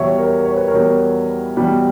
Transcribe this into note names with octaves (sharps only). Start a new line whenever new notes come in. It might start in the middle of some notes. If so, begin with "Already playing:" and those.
Already playing: E2 B2 G3 C#5 E5
A#4 C#5
C#5
B4
A#4 C#5
E2 B2 G3
E2 B2 G3